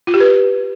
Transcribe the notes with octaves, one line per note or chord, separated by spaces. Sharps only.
F4
G4
B4